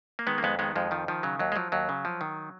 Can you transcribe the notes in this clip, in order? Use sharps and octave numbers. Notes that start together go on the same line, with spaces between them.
A#3
D#3 G#3 B3
A#3
F2 G#3 B3
D#3 G#3 B3
F2 F3 G#3
D#3 F3
D#3 F3
C#3 F#3
D#2 F#3
G#3
F3 F#3
D#2 F#3
C#3
F3
D#3